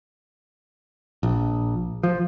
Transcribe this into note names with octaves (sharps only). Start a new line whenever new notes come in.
A#1
F3